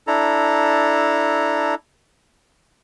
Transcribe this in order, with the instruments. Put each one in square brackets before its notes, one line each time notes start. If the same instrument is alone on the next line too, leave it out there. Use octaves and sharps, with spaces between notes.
[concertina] D4 E4 A4 A#5